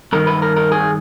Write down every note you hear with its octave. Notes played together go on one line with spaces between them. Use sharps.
G2 D#3 A#4
B4
A#4
A#4
G#4